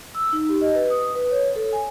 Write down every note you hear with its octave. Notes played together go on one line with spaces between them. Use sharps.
E6
D#4
G4
D#5
B4
D#6
B4
C#5
A4
G#5